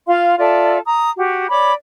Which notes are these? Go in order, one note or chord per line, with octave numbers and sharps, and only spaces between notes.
F4 F5 C6
F4 A4 D5 E5
A#5 D#6
F#4 G4
C#5 D5 B5 D6